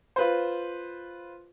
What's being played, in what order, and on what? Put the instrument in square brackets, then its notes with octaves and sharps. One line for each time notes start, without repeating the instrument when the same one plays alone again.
[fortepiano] F4 B4 C5